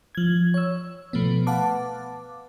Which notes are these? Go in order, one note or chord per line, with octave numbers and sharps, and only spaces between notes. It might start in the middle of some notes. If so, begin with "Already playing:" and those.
F3 G#6
C#5 E6
B2 F3 A3 B3
B4 F5 F#5 A5 D6